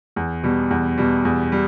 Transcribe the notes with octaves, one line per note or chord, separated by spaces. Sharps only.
E2
B2 G3
E2
B2 G3
E2
G3